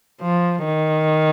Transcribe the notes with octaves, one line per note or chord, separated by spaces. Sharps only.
F3
D#3